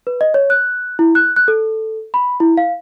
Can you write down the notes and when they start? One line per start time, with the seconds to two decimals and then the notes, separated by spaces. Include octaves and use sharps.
0.07 B4
0.21 D#5
0.34 C#5
0.50 F#6
0.99 E4
1.15 F#6
1.36 F#6
1.48 A4
2.14 B5
2.40 E4
2.57 F5